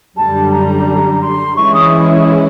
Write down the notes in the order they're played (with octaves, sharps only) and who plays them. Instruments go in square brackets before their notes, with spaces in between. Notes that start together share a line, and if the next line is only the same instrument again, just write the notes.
[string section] F#2 D3 G3 [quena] A5
[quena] A#5
C6
[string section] E3 G#3 C#4 E4 [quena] C#6
[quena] D#6